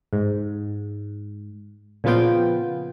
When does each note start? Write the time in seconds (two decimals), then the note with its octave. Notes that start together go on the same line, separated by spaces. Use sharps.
0.13 G#2
2.04 A#2 C#3 F3 B3 F4 G5